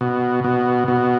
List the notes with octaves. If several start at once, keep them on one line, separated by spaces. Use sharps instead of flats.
B2
B2
B2